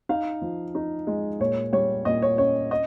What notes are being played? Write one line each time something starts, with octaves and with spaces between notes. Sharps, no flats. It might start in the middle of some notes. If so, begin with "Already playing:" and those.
D#4 F5
F3
D#4
G#3
A#2 C#5
G3 C#5
A#2 D#5
C#5
C#4 C#5
D#5